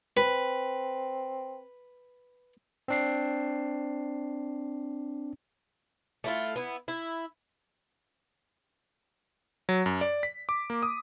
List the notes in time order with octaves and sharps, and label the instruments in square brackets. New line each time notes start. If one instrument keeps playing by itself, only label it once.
[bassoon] C4 [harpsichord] B4
[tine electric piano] C4 D4 C7
[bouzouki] A3 E4 F4
B3 E4
E4
[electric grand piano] F#3
F#2
D5
B6
D6
A#3
D#6